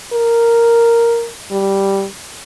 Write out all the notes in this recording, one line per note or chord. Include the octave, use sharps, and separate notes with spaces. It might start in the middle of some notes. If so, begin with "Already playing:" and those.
A#4
G3